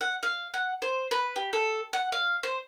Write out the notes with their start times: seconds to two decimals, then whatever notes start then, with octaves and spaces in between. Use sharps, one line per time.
0.01 F#5
0.23 F5
0.54 F#5
0.82 C5
1.11 B4
1.36 G4
1.53 A4
1.93 F#5
2.12 F5
2.43 C5